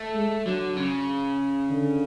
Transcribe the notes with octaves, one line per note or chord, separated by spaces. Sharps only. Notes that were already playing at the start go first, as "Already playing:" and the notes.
Already playing: A3
G#3
D3 F#3
C#3
D3